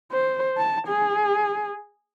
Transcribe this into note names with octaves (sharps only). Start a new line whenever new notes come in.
C5
A5
G#4